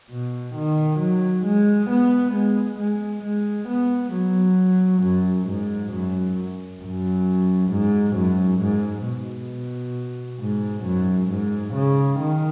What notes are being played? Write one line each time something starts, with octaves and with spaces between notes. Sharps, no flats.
B2
D#3
F#3
G#3
B3
G#3
G#3
G#3
B3
F#3
F#2
G#2
F#2
F#2
G#2
F#2
G#2
B2
G#2
F#2
G#2
C#3
D#3